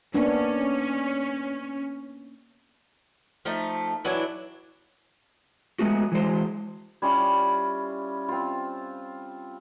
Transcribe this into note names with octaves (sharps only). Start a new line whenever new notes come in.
A#3 B3 C#4 D4
F3 A3 D#4
E3 F#3 D4 E4
F#3 G#3 A3 B3 F#4
E3 F#3 G#3 C5
G3 C#4 E4 F4
C4 F4